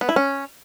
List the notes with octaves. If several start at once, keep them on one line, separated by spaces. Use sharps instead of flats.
B3
E4
C#4